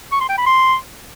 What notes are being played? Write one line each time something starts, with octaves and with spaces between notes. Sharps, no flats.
C#6
C6
G5
B5
C6